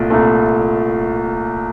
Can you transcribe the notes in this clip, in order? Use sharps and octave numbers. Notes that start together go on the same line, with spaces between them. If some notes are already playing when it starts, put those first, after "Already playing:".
Already playing: C2 A#2 A3
C2 A#2 A3